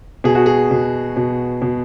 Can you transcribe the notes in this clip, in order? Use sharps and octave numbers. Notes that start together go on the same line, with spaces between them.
B2 G#4
F#4
G#4
B2
B2
B2